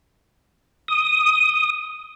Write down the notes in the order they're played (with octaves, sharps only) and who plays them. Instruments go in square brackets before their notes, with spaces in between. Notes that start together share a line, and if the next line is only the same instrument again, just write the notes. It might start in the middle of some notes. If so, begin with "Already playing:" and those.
[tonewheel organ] D#6